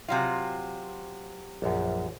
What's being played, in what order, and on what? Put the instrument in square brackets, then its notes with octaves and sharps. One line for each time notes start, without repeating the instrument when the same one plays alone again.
[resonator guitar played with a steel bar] C3 F#3 F4
[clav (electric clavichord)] A#1 F#2